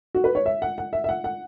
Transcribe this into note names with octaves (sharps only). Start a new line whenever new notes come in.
F#4
B4
C#5
E5
F#5
F#5
E5
E5
F#5
F#5